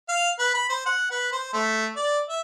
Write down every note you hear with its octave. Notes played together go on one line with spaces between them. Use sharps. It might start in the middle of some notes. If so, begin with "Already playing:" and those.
F5
B4
B5
C5
F#5
B4
C5
A3
D5
E5